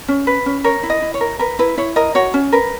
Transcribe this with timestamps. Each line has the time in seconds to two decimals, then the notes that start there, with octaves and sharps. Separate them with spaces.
0.08 C#4
0.27 B4
0.46 C#4
0.64 A#4 C#5
0.83 E4
0.90 D#5
1.02 E4
1.14 C#5
1.21 A#4
1.39 A#4 B4
1.59 E4 B4
1.78 E4 C#5
1.96 A#4 D#5
2.15 F#4 C#5
2.34 C#4
2.53 A#4 B4